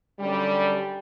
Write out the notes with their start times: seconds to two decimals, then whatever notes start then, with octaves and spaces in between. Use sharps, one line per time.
0.20 F#2 D3 G3